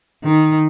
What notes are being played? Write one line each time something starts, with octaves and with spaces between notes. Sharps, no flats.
D#3